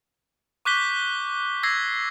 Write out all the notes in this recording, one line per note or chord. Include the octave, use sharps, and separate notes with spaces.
C#6 D6 F#6 G6 B6 G7
E6 G#6 A#6 C7